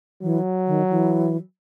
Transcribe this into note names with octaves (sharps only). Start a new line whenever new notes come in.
E3 F#3
D#3
E3